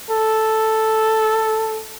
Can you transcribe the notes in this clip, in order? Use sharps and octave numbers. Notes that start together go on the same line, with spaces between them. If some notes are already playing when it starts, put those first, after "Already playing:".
A4